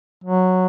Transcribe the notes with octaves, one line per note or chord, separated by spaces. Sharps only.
F#3